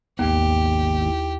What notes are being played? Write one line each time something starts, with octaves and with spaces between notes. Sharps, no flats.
G#1 D#2 A#3 B3 G4
E4